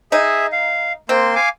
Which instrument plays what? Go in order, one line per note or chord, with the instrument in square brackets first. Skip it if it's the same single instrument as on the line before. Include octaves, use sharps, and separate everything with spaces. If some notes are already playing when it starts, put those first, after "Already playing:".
[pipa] D#4 [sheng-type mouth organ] G#4 E5
[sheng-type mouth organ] F5
[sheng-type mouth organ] A#3 C6 [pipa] C4
[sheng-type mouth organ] F5 G#5 D6